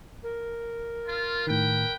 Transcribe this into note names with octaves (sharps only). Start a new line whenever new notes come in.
A#4
F4
A2 D#3 B4 G5